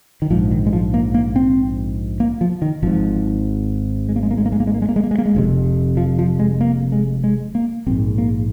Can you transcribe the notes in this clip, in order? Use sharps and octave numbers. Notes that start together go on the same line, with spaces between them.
D#3
A#1 G#2 F3
D#3
G#3
F3
A#3
A#3
C4
A#3
F3
D#3
G#1 G#2 F3
G#3
A#3
G#3
A#3
G#3
A#3
G#3
A#3
G#3
A#3
G#3
A#3
G#3
A#3
G#3
A#3
G#3
F1 F2 C3
F3
F3
G#3
A#3
G#3
G#3
A#3
A#1 G#2 C4
A#3